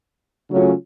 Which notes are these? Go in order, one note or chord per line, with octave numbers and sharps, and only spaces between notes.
C#3 F#3 A3 C#4 F4